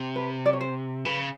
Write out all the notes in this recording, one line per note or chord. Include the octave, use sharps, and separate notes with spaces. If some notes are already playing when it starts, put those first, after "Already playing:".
Already playing: C3
B4
D5
C#5
C5
C#3 B4